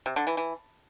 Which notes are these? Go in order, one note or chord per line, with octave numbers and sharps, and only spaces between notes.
C3
D3
E3
E3